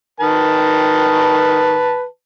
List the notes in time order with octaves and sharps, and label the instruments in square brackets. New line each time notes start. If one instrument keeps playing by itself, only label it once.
[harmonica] D#3 B4 A5